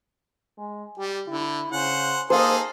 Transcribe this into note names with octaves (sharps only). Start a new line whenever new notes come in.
G#3
G3 G4
D3 E4
C#3 C5 F#5
A#3 D#4 G#4 A4 C5 F5